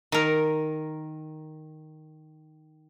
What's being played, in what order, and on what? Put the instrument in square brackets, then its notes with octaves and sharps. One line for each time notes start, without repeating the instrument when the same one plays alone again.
[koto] D#3 A#4